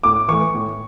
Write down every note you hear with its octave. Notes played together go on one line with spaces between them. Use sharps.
A2 D6
E3 A3 C#6
A2